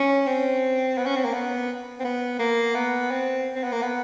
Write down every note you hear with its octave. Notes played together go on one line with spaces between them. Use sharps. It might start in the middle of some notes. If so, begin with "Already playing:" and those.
Already playing: C#4
C4
B3
C#4
C4
A#3
B3
C4
B3
A#3
B3
C4
C4
B3
A#3
B3